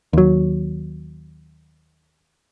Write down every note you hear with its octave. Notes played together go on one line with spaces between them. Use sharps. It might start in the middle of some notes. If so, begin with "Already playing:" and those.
D#2 F#3